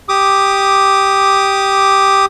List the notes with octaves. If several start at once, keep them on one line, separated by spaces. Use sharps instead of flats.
G4 D6 D#6